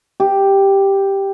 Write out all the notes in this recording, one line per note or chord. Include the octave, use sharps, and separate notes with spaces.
G4